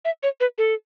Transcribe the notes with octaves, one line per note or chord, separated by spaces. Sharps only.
E5
C#5
B4
A4